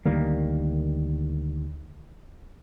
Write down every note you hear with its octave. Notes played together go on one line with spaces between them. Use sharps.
D2 D#3 G3 A#3